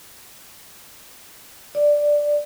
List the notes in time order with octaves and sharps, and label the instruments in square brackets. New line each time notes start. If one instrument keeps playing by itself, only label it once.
[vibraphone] D5